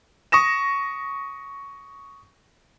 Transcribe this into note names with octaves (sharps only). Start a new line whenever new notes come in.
C#6 D#6 A#6 E7